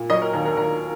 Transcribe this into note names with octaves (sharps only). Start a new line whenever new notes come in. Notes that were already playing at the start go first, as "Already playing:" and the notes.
Already playing: A#2
F#3 D#5
A#4
D#2 A#4
A#4
D#2 A#4